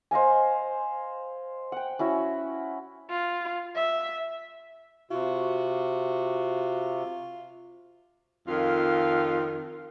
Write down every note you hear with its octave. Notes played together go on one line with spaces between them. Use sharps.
C5 D#5 F5 G#5
F#5 G5
C#4 E4 F#4
F4
E5
C3 F4 F#4
F2 D#3 F4